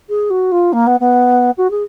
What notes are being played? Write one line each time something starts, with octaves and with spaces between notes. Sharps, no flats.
G#4
F#4
F4
A#3
B3
B3
F#4
G#4